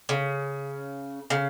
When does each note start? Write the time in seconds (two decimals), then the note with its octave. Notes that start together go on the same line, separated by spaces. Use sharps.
0.09 C#3
1.30 C#3